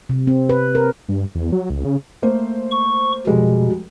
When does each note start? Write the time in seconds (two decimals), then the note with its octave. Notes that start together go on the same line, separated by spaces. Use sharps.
0.09 C3
0.27 C4
0.49 B4
0.75 A#4
1.09 G2
1.35 E2
1.52 F#3
1.70 C#2
1.85 C#3
2.22 A3 A#3 C5
2.71 C#6
3.27 F1 B2 G3 G#3